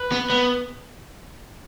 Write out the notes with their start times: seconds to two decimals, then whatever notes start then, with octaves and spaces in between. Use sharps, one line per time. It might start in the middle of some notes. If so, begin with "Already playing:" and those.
Already playing: B4
0.12 B3
0.30 B3